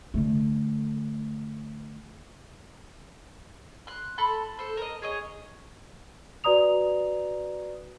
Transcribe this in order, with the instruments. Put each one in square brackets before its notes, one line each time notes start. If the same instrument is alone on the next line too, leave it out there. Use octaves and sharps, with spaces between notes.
[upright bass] D3 A3
[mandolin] C6 F#6
A4 B5 C6
A4 C5
A#4 D#5
G#4 C#5 D#5
[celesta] F#4 B4 D5 A#5 D#6 F7